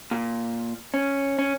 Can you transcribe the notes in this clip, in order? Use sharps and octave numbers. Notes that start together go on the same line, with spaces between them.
A#2
C#4
C#4